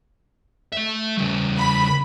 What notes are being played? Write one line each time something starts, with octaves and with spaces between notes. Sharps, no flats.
A3 E5
C#3 G3
B5